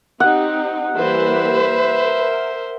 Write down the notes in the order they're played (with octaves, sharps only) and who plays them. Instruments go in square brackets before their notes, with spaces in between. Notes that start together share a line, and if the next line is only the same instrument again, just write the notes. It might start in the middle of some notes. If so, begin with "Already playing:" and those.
[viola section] C4 D#4 G4 [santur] F#5
[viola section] E3 G3 A#3 [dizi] B4 [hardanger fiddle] C5 E5
[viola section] A#4